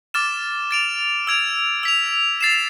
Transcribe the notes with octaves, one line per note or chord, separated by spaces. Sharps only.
D6 F6 A6 E7
A6 D7 F7
E6 G#6 D7 F7
E6 B6 F7
A6 C7 E7